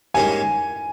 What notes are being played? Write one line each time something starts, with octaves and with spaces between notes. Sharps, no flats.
G#2 G3 A#3 C#4 G4 G#5